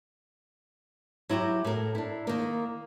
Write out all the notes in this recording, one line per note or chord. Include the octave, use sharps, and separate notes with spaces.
F#3 E4 F#4 G4
A2 A#4
D4 E4
D#3 A#3